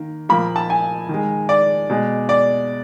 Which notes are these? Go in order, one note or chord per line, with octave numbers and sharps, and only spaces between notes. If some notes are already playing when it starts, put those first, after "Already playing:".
Already playing: D#3 A#3
A#2 F3 A#3 B5
A5
G#5
D#3 G#3
D5
B2 G#3
D5